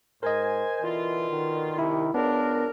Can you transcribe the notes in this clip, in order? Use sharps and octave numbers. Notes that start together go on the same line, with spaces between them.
G#2 A#4 C5 D#5 G#5
B2 D3 E3 F4
D#3
C2 C3 E4
C#2 B3 D4 A#4